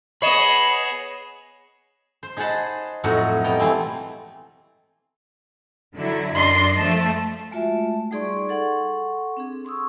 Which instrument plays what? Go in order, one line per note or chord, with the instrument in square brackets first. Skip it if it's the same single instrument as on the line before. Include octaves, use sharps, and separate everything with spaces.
[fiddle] B3 G#4 [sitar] C#5 D#5 [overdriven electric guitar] B5 [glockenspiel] C7 C#7 E7
[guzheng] C5
D#4 G#4 C5 F#5 A5 B5
F2 A2 F#3 D#4 F#4 F#5
B2 G3 G5 A#5
E3 A3 C4
[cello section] D3 F#3 E4
[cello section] F#2 D4 D#5 [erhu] C6
[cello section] F3 A3 [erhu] A5
[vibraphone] G#3 A3 F4 F#4 E5
G3 D#4 G#4 D5 C6 C#6
A4 F#5 C6 C#6
C4 D4 G#4
C6 C#6 D#6 E6